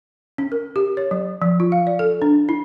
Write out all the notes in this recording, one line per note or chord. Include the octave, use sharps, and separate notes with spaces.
C#4
A#4
G4
C#5
F#3
F3
F4
F5
D5
A4
D4
E4